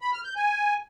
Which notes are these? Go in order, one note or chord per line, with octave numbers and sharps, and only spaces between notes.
B5
F6
G6
G#5